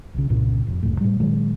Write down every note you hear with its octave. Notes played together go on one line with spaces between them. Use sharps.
B1 C#3
C2 G2 A#2 C#3
F1
F#1 C#2 F#2 A2
A2 G3
A#2 D#3 F#3 G#3